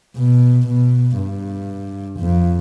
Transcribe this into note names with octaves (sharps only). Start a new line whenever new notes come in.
B2
B2
G2
F2